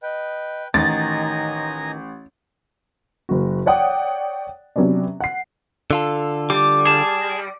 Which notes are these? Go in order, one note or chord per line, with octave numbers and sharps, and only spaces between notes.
B4 D#5 G5
A1 D#3 D#5 G#5 A#5 A6
F#1 A#3 F#4
C#5 D5 F#5 G5 D#6
C3 F#3 B3 C#4 D4
F#5 C7
D3 F4 A4
G3 D6
G#4 A5